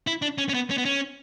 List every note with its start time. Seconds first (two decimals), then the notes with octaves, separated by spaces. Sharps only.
0.07 E4
0.22 D4
0.38 C#4
0.49 C#4
0.54 B3
0.70 C#4
0.78 B3
0.85 C#4